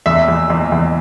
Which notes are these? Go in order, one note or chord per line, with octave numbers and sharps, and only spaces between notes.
E2 E5
E2
E2
E2